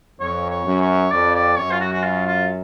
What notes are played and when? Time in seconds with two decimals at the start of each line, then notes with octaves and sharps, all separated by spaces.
0.20 F2 C#5
0.50 C#5
0.65 F#2
0.81 C#5
1.11 F2 D5
1.35 D5
1.57 F#2 C#5
1.71 F4
1.80 F#4
1.92 F#4
2.03 F4
2.26 F4